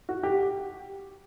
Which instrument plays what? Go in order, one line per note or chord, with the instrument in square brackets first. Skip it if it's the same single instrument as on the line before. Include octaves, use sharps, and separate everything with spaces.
[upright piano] F#4
G4